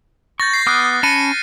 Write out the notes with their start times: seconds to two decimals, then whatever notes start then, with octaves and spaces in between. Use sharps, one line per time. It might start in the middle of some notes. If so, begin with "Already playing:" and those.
0.40 C#6 G6 A6 A#6
0.54 C7
0.66 B3 D6 D#6 F6 F#6
1.03 C#4 A5 B5 A#6 C#7 D#7